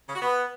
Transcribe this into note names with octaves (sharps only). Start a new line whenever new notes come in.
C#3
F#4
B3